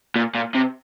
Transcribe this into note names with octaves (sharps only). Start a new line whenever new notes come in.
A#2
A#2
C3